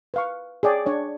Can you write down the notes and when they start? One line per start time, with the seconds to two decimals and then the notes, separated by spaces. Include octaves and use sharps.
0.14 B4 F5 C#6
0.63 G#4 C#5 D5 G5
0.86 D4 C#5 D5